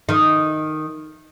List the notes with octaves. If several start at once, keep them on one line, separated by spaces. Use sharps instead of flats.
D#3